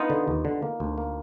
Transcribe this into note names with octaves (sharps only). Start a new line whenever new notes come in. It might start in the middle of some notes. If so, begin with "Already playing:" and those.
Already playing: B3 D#4 F4
D3
D#2
D3
A#3
D2
A#3